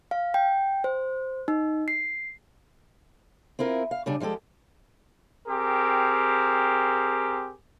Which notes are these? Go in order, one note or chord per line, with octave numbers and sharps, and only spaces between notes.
F5
G5
C5
D#4
C7
C4 E4 F4 A#4
F5
C#3 G3 D4
F3 G3 G#3 G4 A4
C4 G4 G#4 A#4